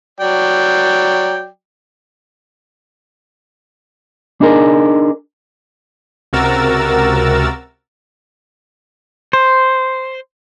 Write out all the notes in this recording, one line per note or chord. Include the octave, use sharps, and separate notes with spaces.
F#3 D5 G5
D4 D#4 G#4 A#4
C#2 C3 F#4 A#4 E6 A6
C5